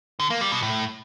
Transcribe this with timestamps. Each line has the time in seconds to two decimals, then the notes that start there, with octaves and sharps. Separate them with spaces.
0.20 D3
0.30 A#3
0.41 G3
0.52 B2
0.63 A2